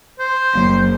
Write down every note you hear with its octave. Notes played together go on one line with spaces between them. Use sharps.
C5
F#1 F#3 A#3